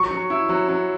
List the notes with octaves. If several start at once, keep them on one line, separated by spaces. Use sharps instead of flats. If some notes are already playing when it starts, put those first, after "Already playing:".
Already playing: F#3 C#6
F#3
E4
F#3
F#3